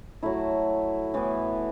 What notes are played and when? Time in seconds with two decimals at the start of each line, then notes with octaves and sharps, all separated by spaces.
0.23 F#3 A3 E4
1.14 A2 E3 B3